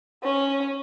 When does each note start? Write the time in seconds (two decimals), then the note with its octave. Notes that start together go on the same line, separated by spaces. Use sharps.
0.23 C#4